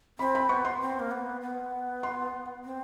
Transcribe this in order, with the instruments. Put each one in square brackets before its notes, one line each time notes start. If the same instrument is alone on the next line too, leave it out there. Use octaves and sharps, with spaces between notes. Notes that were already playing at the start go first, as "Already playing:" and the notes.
[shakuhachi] C4 [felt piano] B5
[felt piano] B5
[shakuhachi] B3 [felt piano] C#6
[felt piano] C6
[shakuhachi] C4
A#3
B3
B3
[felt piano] C6
[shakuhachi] C4